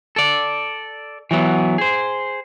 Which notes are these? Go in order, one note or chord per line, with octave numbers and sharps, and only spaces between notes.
A4 D5
E3 F#3 B3
G#4 C5